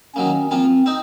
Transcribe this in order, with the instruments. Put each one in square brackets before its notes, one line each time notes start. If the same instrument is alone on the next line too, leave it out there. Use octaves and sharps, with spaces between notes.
[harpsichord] D#3 F#3 A#3 [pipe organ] C#4
[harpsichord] F3 A#3 F4 [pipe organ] C4
[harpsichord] C4 D#4